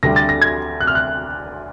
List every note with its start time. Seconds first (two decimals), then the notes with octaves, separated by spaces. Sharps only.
0.03 D2 D3 G3 A#6
0.16 A6
0.29 A#6
0.42 G#6
0.81 F#6
0.87 F6
0.95 F#6